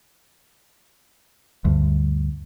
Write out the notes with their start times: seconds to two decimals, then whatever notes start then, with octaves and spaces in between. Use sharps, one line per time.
1.65 D2 G2